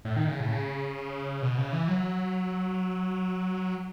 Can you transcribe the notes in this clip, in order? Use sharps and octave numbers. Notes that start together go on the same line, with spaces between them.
A2
D#3
C#3
A2
C#3
B2
C#3
E3
F#3